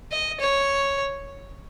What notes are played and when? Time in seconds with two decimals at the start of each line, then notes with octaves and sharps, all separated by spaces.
0.12 D#5
0.40 C#5